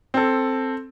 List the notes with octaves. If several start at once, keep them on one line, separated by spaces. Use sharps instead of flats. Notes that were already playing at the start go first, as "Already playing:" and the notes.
C4 A4